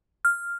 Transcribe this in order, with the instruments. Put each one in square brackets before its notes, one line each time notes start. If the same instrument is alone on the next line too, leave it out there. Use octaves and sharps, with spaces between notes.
[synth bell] F6